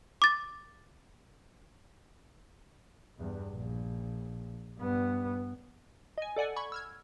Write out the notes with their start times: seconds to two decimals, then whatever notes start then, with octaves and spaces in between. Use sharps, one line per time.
0.22 D6 A6
3.18 E2 G2
3.50 A#1
4.78 G2 B3
6.18 D#5 G#5
6.36 A4 D5 F#5 G#5
6.56 B5 C#6 G#6
6.72 E6 F6 G#6